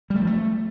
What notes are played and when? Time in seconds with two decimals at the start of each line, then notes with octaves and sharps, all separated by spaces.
0.10 G3
0.16 A3
0.21 F3
0.27 A3